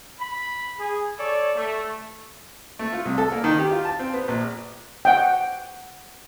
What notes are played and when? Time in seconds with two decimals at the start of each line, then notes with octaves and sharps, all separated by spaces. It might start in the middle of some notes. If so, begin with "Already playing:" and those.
0.20 B5
0.78 G#4
1.17 A4 C#5 D5
1.56 A3
2.79 A3
2.93 F4
3.05 C2
3.18 A4
3.32 A#3
3.44 D#3
3.58 G4
3.71 F4
3.85 A5
3.99 C4
4.14 B3
4.28 A#1
5.05 F#5 G5